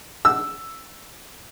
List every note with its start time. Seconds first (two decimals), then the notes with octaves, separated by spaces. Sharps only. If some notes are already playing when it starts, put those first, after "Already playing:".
0.25 E6